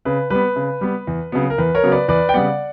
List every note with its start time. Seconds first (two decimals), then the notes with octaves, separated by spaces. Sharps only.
0.05 C#3 B4
0.30 G3 B3 B4
0.56 C#3
0.81 G3 B3
1.07 E2
1.32 C#3 F#3 B3
1.50 A#4
1.58 E2 B4
1.75 A#4 C#5
1.83 C#3 F#3 B3
1.91 B4 D5
2.08 E2 B4 D5
2.29 G5
2.34 C#3 G3 B3 D5 F#5